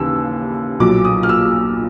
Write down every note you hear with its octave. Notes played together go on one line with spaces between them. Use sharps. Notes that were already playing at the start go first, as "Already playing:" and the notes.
Already playing: D#2 C#3 E3 E6
B1 A#2 F#3 D6
D#6
F6
E6